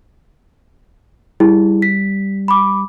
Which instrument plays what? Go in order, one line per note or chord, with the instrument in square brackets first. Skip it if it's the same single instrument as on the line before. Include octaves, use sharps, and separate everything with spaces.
[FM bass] G3 [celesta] E4 G#4
[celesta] B6
B5 D6